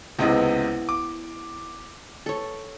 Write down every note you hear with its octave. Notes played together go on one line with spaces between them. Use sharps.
C#2 C3 B3 E4 D#5
D6
A4 C#5